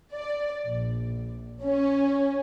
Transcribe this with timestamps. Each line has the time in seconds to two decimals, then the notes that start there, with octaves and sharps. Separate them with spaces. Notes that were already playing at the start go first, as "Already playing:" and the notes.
0.12 D5
0.68 A#1
1.63 C#4